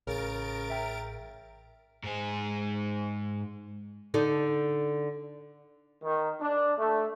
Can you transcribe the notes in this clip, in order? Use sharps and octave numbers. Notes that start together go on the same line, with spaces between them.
A1 C#3 A#4 A6 D7
E5 G5 A#5
G#2 G#4
D3 D#4 A4
D#3
D4
A3